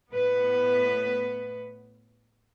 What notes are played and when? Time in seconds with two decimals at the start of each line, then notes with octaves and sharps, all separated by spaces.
0.11 A2 B3 B4